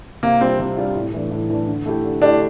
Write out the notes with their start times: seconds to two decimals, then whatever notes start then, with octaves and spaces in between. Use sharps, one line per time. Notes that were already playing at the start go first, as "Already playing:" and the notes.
0.23 C3 A#3
0.41 G3 C4 D4 F4
0.59 C3
0.77 G3 D4 F4
0.95 A2
1.13 E3 A3 D4
1.31 A2
1.50 E3 A3 D4
1.68 D3
1.86 A3 E4 G4
2.05 D3
2.22 A3 D4 E4 G4